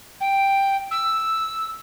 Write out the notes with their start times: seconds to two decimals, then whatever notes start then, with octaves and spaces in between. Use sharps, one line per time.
0.20 G5
0.91 E6